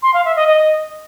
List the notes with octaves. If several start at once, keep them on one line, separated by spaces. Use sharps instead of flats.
C6
F5
E5
D#5
D#5